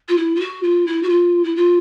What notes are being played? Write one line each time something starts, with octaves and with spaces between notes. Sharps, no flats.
F4
E4
F4
F#4
F4
E4
F#4
F4
E4
F4